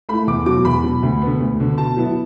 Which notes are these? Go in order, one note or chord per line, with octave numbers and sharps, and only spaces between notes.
A3 E4 B5
E2 D6
B2 F#3 D6
E2 B5
B2 F#3
D2
D3 B3
D2
D3 B3
B2 A5
F#3 B3 E4